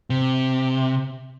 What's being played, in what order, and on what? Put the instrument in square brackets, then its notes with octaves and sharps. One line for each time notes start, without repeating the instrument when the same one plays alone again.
[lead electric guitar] C3